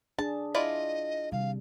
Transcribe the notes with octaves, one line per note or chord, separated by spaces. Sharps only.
D4 G#4 A5
E4 F4 D5 D#5
C3 D#3 G3 F5